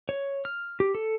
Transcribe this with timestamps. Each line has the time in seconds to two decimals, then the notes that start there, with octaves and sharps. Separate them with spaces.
0.09 C#5
0.45 F6
0.80 G4
0.95 A4